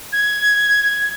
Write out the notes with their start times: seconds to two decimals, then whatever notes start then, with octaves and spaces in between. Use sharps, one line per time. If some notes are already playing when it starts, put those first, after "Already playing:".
0.13 G#6